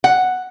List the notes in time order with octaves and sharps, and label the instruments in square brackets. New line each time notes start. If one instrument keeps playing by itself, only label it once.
[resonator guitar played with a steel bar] F#5